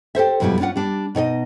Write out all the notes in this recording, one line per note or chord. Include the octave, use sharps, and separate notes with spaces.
G4 A4 C5 E5
F2 B2 F#3 G3 E4
C#4 D4 F4 F#5
G3 D4
B2 D#4 C#5 D#5